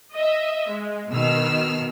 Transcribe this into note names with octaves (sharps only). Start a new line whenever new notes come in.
D#5 E5
G#3
B2 D#3 E6 F6